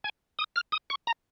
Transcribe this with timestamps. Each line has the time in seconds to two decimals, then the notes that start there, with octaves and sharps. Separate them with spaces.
0.04 G#5
0.39 D#6
0.56 F6
0.72 D#6
0.90 C#6
1.07 A#5